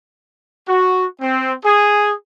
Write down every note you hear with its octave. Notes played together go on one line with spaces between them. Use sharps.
F#4
C4
G#4